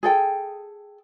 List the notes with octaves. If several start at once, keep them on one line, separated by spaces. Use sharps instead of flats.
G#4 A4 G5